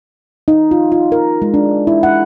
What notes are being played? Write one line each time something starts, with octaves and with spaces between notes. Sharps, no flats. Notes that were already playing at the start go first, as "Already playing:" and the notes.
D#4
F4
F4
A#4
G#3
D4
E4
F#5